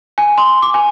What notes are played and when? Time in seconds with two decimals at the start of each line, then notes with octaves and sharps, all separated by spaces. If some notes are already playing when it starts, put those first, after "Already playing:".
0.18 G#5
0.38 C6
0.62 D6
0.74 G#5